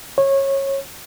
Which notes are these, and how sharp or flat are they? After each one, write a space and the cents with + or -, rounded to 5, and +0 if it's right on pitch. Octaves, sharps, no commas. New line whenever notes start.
C#5 -20